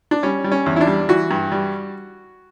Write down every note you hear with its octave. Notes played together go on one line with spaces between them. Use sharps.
D4
G3 C#4
G3
C#4
E2
E4
D4
G3
E3 F#4
G2
G3